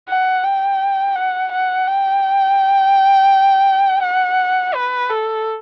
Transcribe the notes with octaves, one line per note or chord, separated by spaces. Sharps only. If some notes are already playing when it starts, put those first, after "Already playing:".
F#5
G5
F#5
F#5
G5
F#5
B4
A4